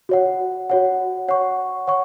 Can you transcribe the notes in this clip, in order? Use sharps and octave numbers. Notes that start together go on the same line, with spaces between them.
F#4 C#5 F#5
F#4 C#5 F#5
C#5 F#5 C#6
C#5 F#5 C#6